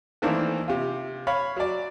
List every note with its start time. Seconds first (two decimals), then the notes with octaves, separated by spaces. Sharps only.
0.22 D#3 E3 A3 A#3 C4 D4
0.68 C3 F4
1.27 C#5 F5 B5
1.57 F#3 D5